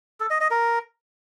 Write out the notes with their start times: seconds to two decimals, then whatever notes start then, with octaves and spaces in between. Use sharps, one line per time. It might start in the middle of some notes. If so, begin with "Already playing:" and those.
0.20 A4
0.30 D#5
0.41 D#5
0.51 A#4